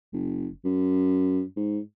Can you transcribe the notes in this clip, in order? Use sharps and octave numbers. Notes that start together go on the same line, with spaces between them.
F#1
F#2
G#2